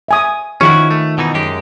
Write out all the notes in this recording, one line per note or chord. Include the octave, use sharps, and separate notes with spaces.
E5 G#5 D#6
D#3 F3 C#4 E4 F#4 C#6
A3
B2 E3 D#4
F#2 G#3 G4